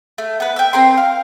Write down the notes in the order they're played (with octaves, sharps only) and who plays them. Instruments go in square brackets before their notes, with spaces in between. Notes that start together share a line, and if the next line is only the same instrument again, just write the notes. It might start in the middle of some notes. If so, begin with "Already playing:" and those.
[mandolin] A3
B3 B4
E5 G5
C4 A#4 C6
F5